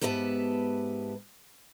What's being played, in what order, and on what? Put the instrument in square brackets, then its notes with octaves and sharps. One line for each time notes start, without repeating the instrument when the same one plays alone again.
[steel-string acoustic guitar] G#2 B3 G4 B4 E5 A5